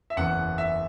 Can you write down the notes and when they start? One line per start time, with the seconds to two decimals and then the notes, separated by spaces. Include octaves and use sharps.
0.10 E5
0.16 F#1 E2 E3 C#4 F#5
0.58 E5